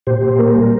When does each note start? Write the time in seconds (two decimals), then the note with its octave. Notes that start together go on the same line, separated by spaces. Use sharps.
0.07 A#2 G4 C5
0.23 A#2
0.39 A#3 A#4
0.56 G3